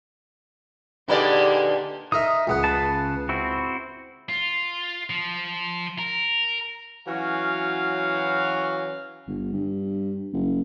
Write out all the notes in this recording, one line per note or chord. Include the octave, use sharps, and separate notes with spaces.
A#2 D3 A#3 D#4 G4 G#4 B4 D5
D#4 A#4 E5 D#6
C#2 B3 F#5
C#3 B4 A5
C4 E4 F#4
F4
F3
A#4
E3 F#3 C#4 F#4 F5
G1
G2
F#1